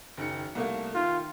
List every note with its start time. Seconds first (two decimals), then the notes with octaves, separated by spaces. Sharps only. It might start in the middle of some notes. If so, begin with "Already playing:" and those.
0.17 F#1 D#3 C#7
0.55 C2 A3 A#3
0.95 D#3 F4